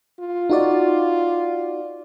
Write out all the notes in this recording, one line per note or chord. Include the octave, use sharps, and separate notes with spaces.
F4
D#4 F#4 D5